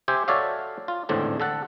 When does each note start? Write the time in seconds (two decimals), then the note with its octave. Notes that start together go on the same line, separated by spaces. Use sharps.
0.08 G4 C5 E5 G#5
0.28 F#4 A4 C#5 D5 E5 F5
0.88 F4
1.09 G#1 E2 A2 D3 C4 D4
1.40 D3 A4 F#5